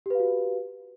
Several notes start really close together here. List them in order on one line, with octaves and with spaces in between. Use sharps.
G4 B4 F5 F#4